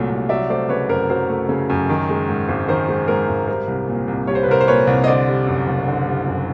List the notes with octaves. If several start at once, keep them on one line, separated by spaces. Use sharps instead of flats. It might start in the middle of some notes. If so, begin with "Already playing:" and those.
Already playing: C2 A#2 F#3 A3
C2
F#3 D5 E5
A3 C5 D5
C#3 B4 C#5
F#2 A#4 C5
F#3 A#4 C5
A3
C#3
F#2
D#3
G#3
G#2
G#1
D#3 A#4 C5
G#3
G#2 A#4 C5
G#1
G3 A#4 C5
C2
A#2
C2
G3 C#5
C5
B4
C2 A#4 C5
C5
A#2 B4 C#5
C2
D#5
D3 C5 D5
G3
F#2
F#1
D3
G3
F#2